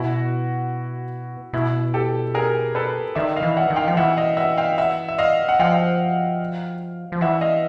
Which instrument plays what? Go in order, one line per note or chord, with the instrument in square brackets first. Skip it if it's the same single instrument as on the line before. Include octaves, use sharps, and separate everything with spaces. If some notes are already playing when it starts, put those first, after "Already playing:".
Already playing: [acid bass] B2 [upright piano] E4 F#4
[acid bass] B2 [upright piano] E4
[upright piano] G4 A4
G#4 A#4
A4 B4
[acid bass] D#3 [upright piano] D5 E5
[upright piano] D#5 F5
[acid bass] E3
[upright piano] E5 F#5
[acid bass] D#3
[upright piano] F5 G5
[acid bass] F3
[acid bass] E3 [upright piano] E5 F#5
[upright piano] D#5 F5
E5 F#5
F5 G5
E5 F#5
E5
D#5 F5
F#5
[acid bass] F3 [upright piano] F5 G5
[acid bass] F3
[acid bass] E3 [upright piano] E5 F#5
[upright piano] D#5 F5